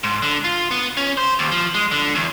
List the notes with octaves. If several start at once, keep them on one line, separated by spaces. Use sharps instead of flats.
G#2
D3
F4
B3
C#4
C5
D#2
F3
G#3
D3
E2